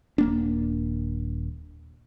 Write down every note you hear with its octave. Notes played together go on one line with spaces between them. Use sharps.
D#1 A#3 D4